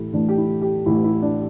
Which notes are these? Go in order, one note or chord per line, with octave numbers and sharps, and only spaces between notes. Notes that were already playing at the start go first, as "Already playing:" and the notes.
Already playing: A1 A2 E3 E4 G4 A4
A1 A2 E3 D4
G4
E4
G4
A1 A2 E3 E4
E4
D4